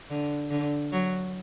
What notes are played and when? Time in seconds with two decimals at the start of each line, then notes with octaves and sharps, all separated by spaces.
0.10 D3
0.50 D3
0.92 F#3